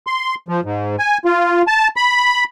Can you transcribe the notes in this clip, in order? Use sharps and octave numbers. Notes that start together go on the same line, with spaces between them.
C6
F3
G#2
G#5
F4
A5
B5